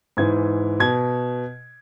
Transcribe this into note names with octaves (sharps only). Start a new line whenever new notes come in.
G#2 E3 G#6
B2 G#6